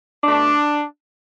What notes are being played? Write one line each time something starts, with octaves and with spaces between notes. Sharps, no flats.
B2 A3 D4